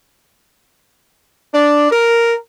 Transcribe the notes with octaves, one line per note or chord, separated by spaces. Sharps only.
D4
A#4